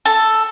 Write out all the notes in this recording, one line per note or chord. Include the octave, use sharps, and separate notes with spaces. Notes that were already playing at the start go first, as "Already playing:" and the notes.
A4